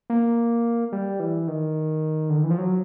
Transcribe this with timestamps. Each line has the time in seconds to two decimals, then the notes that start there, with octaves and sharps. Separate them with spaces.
0.10 A#3
0.92 G3
1.20 E3
1.48 D#3
2.30 D3
2.37 D#3
2.44 E3
2.51 F3
2.58 F#3